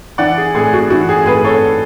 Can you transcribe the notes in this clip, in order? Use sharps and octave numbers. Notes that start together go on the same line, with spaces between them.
E3 D5 F#5
G#4
A2 G#4
F#4
E3 F#4
G#4
A2 G#4 B4
A4 C#5